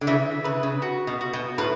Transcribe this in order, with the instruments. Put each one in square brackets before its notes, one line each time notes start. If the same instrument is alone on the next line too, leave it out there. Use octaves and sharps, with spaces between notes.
[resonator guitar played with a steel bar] D3
[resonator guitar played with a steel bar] C#3 E3 [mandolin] E5
[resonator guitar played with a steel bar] C#3 [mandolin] B4
[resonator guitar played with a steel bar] C#3
[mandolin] F#4
[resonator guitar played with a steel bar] B2
[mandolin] F#4
[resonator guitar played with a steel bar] B2
[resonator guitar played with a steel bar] A2 [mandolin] B4